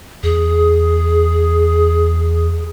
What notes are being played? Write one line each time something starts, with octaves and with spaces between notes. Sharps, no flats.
E2 G#4